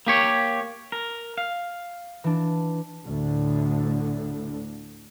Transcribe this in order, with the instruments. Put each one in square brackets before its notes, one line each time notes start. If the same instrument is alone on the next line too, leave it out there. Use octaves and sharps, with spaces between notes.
[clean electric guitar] A#3 G4 C#5
A#4
F5
[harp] E3 D4
[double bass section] D2 A2 D3